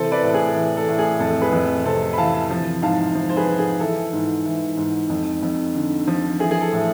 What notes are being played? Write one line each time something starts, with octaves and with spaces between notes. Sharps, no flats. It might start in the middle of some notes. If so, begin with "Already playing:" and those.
Already playing: C3 E3 A4 C5
B4 D5
A2
A4
G#4
E3
A4
A2
G#4
F2 A4
G#4 B4
F2
C3 A4 C5
B5
E3 F5 A5
F3
G#2 F5 A5
F3
C5
G#4 B4
G#2
G#4
E3 A4
G#2
E3
G#2
F2
F2
D3
F3
E3 G#4
G#4
A4
A2